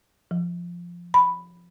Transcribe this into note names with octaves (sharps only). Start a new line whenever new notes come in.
F3
B5